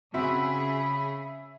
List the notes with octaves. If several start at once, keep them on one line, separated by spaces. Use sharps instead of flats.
C#3 C4 F#4 G#4 E5 F#5 B5